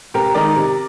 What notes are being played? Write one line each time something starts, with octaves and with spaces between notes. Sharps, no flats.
C3 G4 A#4
D#3 G#3 D#4 A#4 D5
C3